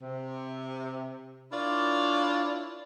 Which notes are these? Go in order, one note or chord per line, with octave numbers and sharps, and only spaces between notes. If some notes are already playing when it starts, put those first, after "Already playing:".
C3
D4 E4 F4 A#4 C#5 D5